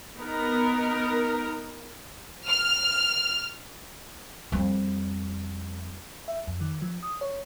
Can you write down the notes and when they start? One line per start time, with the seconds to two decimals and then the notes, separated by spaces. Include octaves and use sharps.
0.17 B3 D#4 A#4
2.47 F6
4.52 F2 G3
6.28 E5
6.47 F2
6.61 D#3
6.82 F3
7.03 D#6
7.21 C#5